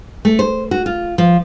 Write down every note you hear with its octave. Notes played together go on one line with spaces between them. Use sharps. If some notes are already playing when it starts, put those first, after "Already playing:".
A3
C5
F#4
F4
F3